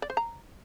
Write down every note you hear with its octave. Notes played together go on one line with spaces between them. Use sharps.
D5
C5
A#5